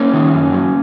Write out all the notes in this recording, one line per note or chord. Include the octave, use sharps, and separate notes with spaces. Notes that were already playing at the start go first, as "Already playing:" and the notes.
Already playing: A#3 C#4
D#3
F#2
F#3